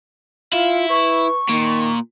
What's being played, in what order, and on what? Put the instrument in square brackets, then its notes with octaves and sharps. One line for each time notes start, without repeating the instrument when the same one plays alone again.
[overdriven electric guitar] E4 [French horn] F4 [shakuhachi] F5
[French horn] B4 [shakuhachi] C#6
[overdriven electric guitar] A#2 [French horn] D#3